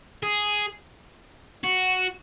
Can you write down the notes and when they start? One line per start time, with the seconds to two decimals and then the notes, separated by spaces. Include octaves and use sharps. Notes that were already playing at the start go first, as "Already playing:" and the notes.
0.23 G#4
1.64 F#4